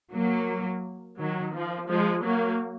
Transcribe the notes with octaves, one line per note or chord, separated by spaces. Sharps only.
F#3 A#3
D#3 F#3
F3
F3 G#3
F#3 A#3